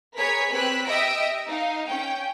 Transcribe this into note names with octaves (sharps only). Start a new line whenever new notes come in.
G#4 A#4 B4 C#5 G#6 B6
C4 G4 B4 B5 E6 F#6
G4 D#5 E5 E6 A#6 D7
D#4 F5
C#4 G5